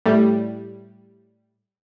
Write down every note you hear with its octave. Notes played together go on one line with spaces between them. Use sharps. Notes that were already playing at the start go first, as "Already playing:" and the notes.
A2 G3